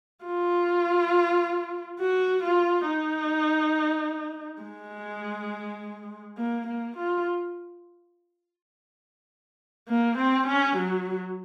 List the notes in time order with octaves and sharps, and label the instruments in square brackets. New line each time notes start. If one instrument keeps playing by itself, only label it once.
[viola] F4
F#4
F4
D#4
G#3
A#3
A#3
F4
A#3
C4
C#4
F#3